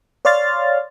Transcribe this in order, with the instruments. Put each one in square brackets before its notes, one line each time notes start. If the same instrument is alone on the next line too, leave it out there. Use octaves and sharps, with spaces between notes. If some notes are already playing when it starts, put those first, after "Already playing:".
[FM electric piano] C#5 D5 F5 C6 F6 A6